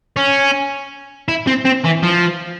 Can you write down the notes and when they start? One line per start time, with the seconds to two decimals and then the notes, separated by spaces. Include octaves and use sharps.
0.16 C#4
1.28 E4
1.47 C4
1.65 C4
1.84 E3
2.03 F3